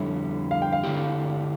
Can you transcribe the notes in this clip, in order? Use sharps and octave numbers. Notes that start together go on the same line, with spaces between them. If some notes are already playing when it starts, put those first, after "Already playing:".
Already playing: F2 D3 G3 C#4 E4
F5
G5
F5
D3 A3 E4 G4